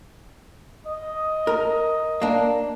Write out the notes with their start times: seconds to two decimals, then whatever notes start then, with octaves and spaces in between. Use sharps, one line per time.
0.86 D#5
1.47 A#4
2.22 A#3 D4